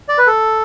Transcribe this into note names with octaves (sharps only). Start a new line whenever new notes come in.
D5
B4
A4